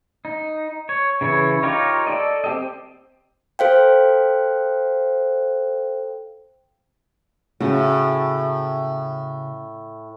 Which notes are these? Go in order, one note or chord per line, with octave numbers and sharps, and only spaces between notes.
D#4
C#5
C#3 E3 E4 C#5
D#4 F4 G4 A#4 C#5
A4 D5 D#5
C4 G4 D#5
A4 C5 F5 G5
A2 C#3 F#4